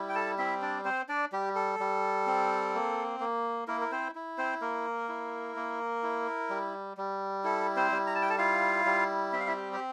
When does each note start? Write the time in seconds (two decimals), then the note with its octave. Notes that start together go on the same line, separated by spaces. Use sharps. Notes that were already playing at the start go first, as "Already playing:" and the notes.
Already playing: G3 E4
0.09 G5
0.15 A4 A5
0.38 C4 E4 E5
0.62 D4 D5
0.85 C4 C5
1.09 D4 D5
1.32 G3 G4
1.55 A4
1.79 G3
2.27 C4
2.74 A#3
3.20 A#3
3.67 A#3 E4 A#4
3.81 A#4
3.92 C4 C5
4.15 E4
4.38 C4 C5
4.61 A#3 A#4
5.09 E4
5.56 A#3
6.03 E4
6.50 G3
6.97 G3
7.44 E4 A4
7.76 C4 C5
7.92 G3
8.07 A#5
8.15 A5
8.22 G5
8.30 A4 A5
8.38 E4 F4 F5
8.86 G3
9.33 C4 E5
9.40 F5
9.47 E4 E5
9.56 G4
9.73 G4